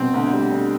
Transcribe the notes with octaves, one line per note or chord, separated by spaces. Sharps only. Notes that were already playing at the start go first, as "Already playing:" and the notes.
Already playing: B2 C4
D2
G3
D3